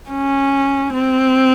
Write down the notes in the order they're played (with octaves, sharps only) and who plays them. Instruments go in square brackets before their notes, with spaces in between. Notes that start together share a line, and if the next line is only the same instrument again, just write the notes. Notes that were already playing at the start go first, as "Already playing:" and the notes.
[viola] C#4
C4